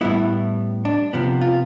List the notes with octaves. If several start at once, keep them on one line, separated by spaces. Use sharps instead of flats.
A2 G3 B3 E4
D4
C3 F3 B3
F4